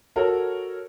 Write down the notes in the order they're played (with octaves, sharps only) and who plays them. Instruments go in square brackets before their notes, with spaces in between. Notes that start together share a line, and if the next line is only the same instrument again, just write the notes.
[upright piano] F#4 A4 A#4 C#5